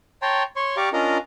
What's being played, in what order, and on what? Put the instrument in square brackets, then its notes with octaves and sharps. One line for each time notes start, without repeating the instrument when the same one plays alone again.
[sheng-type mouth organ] C#5 G5 A5 A#5 C6
C#5 C6 C#6
G4 D5 F5 A#5 C#6 D6
C#4 D4 F4 A#4 D#5 A#5